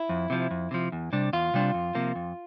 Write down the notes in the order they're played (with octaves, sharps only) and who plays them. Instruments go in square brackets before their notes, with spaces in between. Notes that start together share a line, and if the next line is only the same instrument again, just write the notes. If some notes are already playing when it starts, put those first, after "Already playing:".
Already playing: [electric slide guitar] E4
F2
C3 F3
F2
C3 F3
E2
C3 G3 D4
E2 F4
C3 G3 D4
F2
C3 F3 A#3
F2